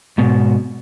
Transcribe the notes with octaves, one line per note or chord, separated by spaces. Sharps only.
G#2 B2